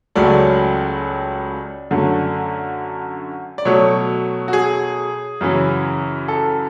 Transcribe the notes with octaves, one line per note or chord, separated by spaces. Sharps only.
C#2 C#3 F#3 A3 D5
F#2 D3 A3
D5
B2 F#3 A3 C#5
F#4
G#4
F#2 C#3 E3
A4